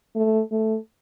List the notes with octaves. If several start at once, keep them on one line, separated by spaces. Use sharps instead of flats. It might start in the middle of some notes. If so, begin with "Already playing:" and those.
A3
A3